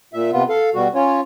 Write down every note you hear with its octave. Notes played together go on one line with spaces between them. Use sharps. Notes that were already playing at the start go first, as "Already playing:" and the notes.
A#2 E5
C3 B3 F4
A4 F5
B2 G3 F#4
C#4 F4 C#5